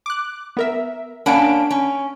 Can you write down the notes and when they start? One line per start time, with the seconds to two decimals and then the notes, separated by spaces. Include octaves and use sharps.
0.06 D6 F#6
0.57 B3 A#4 E5
1.26 A#3 C#4 D4 F#5 B5 D7
1.71 C#4